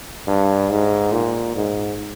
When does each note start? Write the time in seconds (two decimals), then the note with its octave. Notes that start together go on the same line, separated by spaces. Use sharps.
0.27 G2
0.70 G#2
1.12 A#2
1.56 G#2